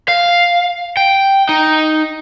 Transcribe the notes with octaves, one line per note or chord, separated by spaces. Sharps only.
F5
G5
D#4